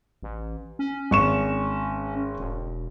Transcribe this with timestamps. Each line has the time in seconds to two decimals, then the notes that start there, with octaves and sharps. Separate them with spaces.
0.23 A1
0.79 C#4
1.11 G#1 C#6 E7
2.39 E1